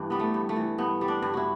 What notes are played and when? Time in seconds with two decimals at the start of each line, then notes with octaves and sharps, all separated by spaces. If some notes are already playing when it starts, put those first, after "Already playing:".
Already playing: G2 E3 D4
0.10 G3 B3
0.19 A3
0.34 G2
0.49 A3
0.56 E3
0.78 G2 B3
1.01 G3
1.08 D4
1.22 G2
1.34 E4 F#4